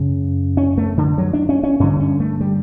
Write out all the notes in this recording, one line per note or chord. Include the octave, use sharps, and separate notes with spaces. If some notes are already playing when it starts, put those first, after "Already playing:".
Already playing: F#2 C#3
C#4
A3
D3
F#3
D4
C#4
C#4
G2 D3 C#4
C#4
A3
G3